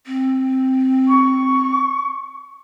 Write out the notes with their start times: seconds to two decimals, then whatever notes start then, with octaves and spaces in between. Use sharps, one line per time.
0.07 C4
1.08 C#6